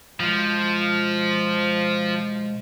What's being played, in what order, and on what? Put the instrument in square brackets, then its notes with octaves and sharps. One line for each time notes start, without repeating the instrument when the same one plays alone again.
[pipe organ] B2 G#3 [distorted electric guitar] F3